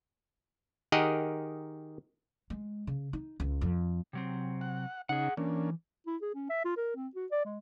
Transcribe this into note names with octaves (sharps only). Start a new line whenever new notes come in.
D#3 G4 G#4 A#4 D#5 F#5
G#3
C#3
D#4
C#2
F2
C3 F#3 C4
F#5
C#3 D#4 G#4 F#5
E3 A#3 C#4 D4
E4
G#4
C#4
E5
F4
A#4
C4
F#4
D5
G#3